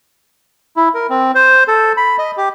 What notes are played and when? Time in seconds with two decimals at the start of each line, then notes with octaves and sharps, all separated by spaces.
0.76 E4
0.94 A#4
1.10 C4
1.35 C5
1.68 A4
1.97 B5
2.19 D#5
2.37 G4